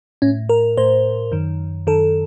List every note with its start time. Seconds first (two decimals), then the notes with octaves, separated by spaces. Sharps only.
0.22 A2 C#4
0.49 A#4
0.77 A2 C5
1.32 F#2 D#3
1.87 F#2 D#3 A4